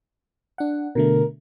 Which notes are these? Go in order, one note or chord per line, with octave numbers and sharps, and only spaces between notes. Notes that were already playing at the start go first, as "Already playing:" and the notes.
D4 F#5
B2 D3 A3 A#4